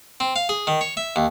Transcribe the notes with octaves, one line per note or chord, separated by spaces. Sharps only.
C4
F5
G#4
D#3
C#5
E5
D#2